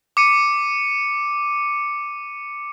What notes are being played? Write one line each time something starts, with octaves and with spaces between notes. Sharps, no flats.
D6 C#7 D#7